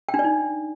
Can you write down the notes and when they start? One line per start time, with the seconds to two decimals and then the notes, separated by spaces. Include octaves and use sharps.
0.09 G5
0.14 D4
0.19 D5
0.24 D#4